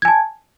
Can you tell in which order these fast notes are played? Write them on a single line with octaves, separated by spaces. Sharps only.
G#6 G#5 A5